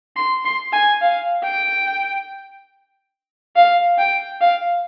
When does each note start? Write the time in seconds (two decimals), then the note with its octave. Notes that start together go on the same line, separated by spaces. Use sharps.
0.16 C6
0.45 C6
0.73 G#5
1.01 F5
1.44 G5
3.56 F5
3.98 G5
4.41 F5